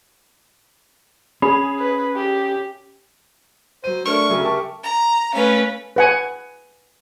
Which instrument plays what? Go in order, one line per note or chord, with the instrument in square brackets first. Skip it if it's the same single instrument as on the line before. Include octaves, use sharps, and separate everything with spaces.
[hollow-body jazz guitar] C#4 [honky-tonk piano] G#4 [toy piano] B5
[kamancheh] B4
G4
[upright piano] F#3 D#7 [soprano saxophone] C5
[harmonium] A3 D4 [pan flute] A#4 [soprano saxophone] C#6
[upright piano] D2 C#3 F#3 [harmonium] E5
[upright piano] G4 A5 C#6
[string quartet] A#5
[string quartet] A3 F5 [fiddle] C#4 B4
[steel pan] B4 F#5 G#5